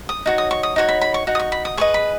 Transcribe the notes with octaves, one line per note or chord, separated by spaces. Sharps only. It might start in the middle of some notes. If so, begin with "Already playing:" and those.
D#6
D#4 F#4 C#5
D#6
C#6
D#6
D#4 F#4 C#5
B5
B5
C#6
D#4 F#4
D#6
C#6
B5
D#6
G#4 B4 D#5 C#6
B5